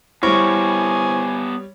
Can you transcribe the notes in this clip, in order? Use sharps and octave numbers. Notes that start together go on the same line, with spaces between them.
G3 B3 E4 G4 C5 C#5 G#5 C#6